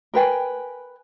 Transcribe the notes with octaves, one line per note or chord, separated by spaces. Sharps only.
A#4 B4 G5 G#5